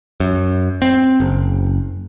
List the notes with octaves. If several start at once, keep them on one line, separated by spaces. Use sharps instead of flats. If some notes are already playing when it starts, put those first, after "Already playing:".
F#2
C4
F#1